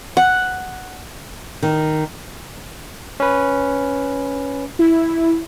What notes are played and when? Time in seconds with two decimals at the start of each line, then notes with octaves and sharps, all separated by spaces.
0.17 F#5
1.63 D#3
3.20 C#4 B4
4.79 E4